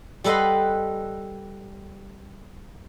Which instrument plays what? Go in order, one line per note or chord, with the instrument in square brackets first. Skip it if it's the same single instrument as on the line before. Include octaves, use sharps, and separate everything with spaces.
[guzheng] G3 A4 B4 D#5 F#5 C6